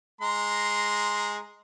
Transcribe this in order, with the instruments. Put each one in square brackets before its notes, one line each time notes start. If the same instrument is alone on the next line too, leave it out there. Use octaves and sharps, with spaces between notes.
[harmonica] G#3 A#5 C6